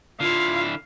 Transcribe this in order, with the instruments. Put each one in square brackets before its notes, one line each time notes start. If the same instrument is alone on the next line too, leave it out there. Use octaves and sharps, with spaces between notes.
[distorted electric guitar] D3 E4 [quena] F4 [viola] F5